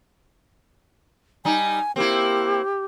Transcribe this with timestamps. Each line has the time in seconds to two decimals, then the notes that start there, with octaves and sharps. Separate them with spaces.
1.45 G3 D#4 G#5
1.96 A#3 C4 E4 G4